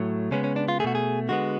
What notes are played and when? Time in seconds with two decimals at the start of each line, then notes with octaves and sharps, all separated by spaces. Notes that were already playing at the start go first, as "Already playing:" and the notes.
Already playing: A2 F#3 A3
0.31 C#3 G#3 B3 C#4
0.44 C#4
0.56 D4
0.68 F4
0.80 A3 G#4
0.84 B2 F#4
0.95 G#4
1.29 D3 G#3 B3 F#4